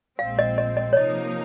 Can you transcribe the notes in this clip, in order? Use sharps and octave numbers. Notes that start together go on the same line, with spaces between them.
A#1 A#2 G#3 C4 F5
D#5
D#5
D#5
C#5
C3 F3 A#3 D#4 D#5